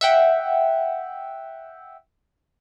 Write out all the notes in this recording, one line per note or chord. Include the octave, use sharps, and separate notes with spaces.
E5 F#5 G5